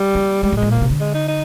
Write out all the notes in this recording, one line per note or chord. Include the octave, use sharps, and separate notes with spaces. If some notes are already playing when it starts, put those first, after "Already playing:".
Already playing: G3
A#3
G3 G#3
A#2
G#3
A#2
A#3
D3
C3
D3
G#3
D#4
D#4